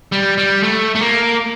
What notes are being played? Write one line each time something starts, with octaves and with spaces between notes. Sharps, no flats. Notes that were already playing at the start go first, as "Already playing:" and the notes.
G3
G3
A3
A3
A#3